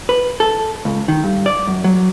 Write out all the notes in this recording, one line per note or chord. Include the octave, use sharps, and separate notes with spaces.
B4
A4
C#2
D#3
G2
D5
F#2
F#3